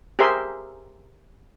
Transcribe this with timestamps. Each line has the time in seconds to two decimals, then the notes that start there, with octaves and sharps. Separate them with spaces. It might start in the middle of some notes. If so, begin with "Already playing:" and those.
0.19 G4 G#4 A#4 C5 E5 C6